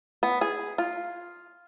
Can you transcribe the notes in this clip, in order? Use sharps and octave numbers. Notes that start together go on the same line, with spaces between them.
B3
G#4
F4